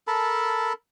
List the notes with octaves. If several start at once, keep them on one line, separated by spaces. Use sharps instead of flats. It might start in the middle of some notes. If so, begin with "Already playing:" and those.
A4 A#4 A5 B5